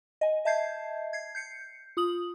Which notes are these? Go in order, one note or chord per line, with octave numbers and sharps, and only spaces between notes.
D#5 G#5
D#5 E5 A5 G6 G#6 C7
G#6 C7
G6 C7 C#7
F4 D#6 F#7